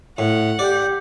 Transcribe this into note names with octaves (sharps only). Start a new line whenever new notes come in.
A2 F#5
G4 D5